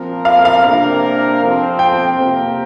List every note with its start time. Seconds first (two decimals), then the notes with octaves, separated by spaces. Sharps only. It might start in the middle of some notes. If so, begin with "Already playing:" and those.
Already playing: A#2 F3 C4 A#4
0.25 F5
0.45 F5
0.64 C3 A#3 D4 A#4 F5
1.40 F2 F3 C4
1.79 G5
2.18 F2 C3 A#3 G4 A#4